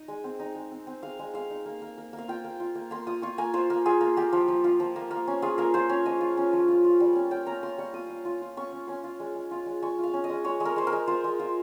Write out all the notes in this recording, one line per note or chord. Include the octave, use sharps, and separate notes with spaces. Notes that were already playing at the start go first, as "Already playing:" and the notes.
Already playing: D#4 D#5
G#3
C4
D#4
G#3
C4
C4
G#3 F5
G#3
G#3 F5
D#4
A#3
A#3
A#3
A#3
F5
F4 G5
A#3
F4
A#3
A#3 C6
F4 D#6
F4 C#6
A#3 G#5
F4 C5
A#3
F4 G#4
A#3
A#3 G4
F3
F3
F4
F3
A#3
A#3
C#4
F4 G#4
A#3 A#4
F4 C5
C#4 C#5
F3 D#5
F4
C#4
F3
F4
F4
G3
C#4
C#4 G5
C#4 A#5
F4 C6
G3 C#6
F4 D#6
F4
F4
F4
C#4 C#6
C#4
C#4 C6
F4
G#3
G#3
F4
G#3
G#3 C#6
F4 F5
C#4
D#5
G#3
G#3 C#5
G#3
A#4
G#3 C5
A#4
G#3
F4 C5
G#3
F4